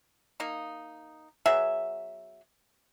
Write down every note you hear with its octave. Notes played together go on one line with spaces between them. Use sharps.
A#3 D#4
F#3 B3 G#4 E5